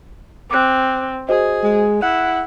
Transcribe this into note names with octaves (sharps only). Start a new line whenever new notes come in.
C4 D6 F#6
F#4 G#4 C5 D#5
G#3
E4 F#5 F#6